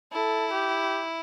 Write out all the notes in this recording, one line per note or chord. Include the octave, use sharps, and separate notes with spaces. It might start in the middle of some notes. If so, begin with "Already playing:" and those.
E4 A4
G4